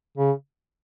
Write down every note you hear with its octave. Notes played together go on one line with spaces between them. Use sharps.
C#3